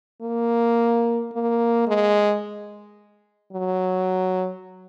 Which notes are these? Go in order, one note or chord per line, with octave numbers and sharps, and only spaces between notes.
A#3
A#3
G#3
F#3